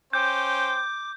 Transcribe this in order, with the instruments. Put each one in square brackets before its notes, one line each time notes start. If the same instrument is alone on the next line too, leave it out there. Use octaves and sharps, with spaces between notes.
[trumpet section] C#4 C5 G5 [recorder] D6 [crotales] G6